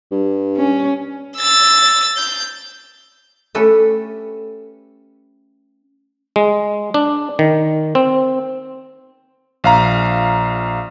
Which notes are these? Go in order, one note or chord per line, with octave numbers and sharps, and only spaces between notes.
G2
C#4
E6 A6
G6
A3 C#4 G4 A4 B4
G#3
D4
D#3
C4
A#1 F5 A#5